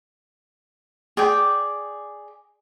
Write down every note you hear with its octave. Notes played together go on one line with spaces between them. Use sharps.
G#4 D5 G5